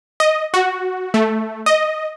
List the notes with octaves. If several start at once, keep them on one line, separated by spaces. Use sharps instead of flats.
D#5
F#4
A3
D#5